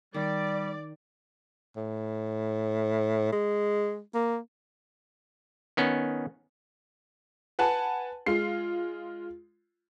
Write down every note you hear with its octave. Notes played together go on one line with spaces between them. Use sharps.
D#3 G3 D5
A2
G#3
A#3
D#3 B3 C#4
B4 F#5 G#5 A5
G#3 F4 C7